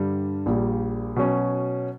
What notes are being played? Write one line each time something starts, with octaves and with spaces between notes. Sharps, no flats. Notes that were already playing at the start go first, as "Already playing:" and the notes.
Already playing: G2 D3 G3
A#1 A#2 G3
B2 F#3 C#4